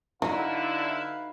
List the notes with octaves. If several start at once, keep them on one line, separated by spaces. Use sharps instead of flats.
D3 F#3 D#4 E4 F#4 B4 F5